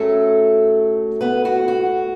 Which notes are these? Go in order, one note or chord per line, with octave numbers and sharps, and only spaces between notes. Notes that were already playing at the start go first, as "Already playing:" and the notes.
Already playing: A2 F#3 A3 C#4 A4
B3 B4
F#4
F#4